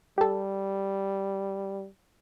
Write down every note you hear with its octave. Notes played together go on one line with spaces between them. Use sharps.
G3 G4 A4